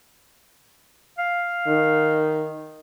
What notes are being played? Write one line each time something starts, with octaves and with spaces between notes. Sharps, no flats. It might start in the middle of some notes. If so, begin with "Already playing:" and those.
F5
D#3